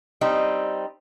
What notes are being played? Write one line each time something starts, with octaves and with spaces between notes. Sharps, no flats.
G3 C4 D#4